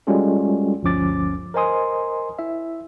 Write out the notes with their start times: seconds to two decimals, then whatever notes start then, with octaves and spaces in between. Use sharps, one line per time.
0.07 G3 G#3 C#4 F4 F#4 A4
0.83 G1 D2 F3 C#4 D6 A6
1.54 A#4 C5 D#5 G#5 C6 D#6
2.39 E4 E5